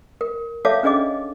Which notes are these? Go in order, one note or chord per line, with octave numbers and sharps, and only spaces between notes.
A#4
A4 C#5 E5 F5 A5 D6
C#4 D4 G#4 D#5 D6